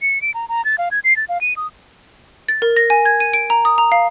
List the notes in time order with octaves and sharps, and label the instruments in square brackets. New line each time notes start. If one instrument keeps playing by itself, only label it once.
[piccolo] C#7
D7
A#5
A#5
A6
F5
G#6
C7
A6
F5
D#7
D#6
[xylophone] A6
A#4
A#6
G#5
G#6
D#7
D7
A#5
D#6
A#5
F5